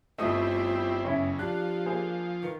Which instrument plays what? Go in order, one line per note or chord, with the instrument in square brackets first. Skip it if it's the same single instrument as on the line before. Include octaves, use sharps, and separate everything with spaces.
[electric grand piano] G1 D#5 [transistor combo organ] G3 C4 E4 [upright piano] A3 D#6 [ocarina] F4
[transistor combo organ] F#2 C#3 [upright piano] C#4 E4
[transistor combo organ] F3 [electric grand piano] D4 [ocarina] G4 [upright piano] F#6
[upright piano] A#3 G#4 C5
[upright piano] D#3 [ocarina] B4